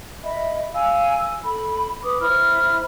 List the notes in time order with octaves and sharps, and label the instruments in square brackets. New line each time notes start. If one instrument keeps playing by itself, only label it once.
[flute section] D#5 E5 B5
F5 G#5 E6
E6
A4 B5
B4 D6 D#6
E4 C5 B5 F6